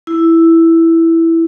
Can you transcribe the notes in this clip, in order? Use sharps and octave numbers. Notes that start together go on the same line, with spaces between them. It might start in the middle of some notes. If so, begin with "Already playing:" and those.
E4